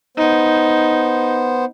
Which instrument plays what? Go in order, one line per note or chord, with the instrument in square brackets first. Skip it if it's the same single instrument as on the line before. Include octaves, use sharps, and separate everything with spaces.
[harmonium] B3 C5 [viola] D#4